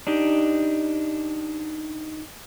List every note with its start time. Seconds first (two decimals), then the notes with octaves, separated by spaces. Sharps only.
0.07 D4 D#4 G4